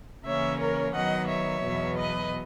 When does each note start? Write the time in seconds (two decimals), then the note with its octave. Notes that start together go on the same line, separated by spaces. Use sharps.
0.25 C#3 E3 A#3 C#4 C#5 E5
0.59 A#4 C#5
0.94 D#3 F#3 B3 D#5 F#5
1.28 C#5 E5
1.63 E2 B2 F#3 B3
1.97 B4 D#5